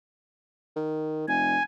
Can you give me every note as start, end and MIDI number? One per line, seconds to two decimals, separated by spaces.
0.76 1.24 51
1.28 1.58 29
1.28 1.62 80